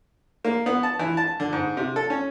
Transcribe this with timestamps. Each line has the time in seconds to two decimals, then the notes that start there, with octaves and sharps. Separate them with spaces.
0.45 A#3
0.66 B3
0.83 A5
0.99 E3
1.17 A5
1.40 D3
1.53 G#2
1.77 C3
1.96 A4
2.10 C#4